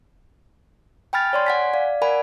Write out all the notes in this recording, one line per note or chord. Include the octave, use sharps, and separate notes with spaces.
G5 G#5 B5 F6 A6
C#5 D5 C6
F#5 G#5 B6
D5 F5
A#4 D5 F#5 G#5 B5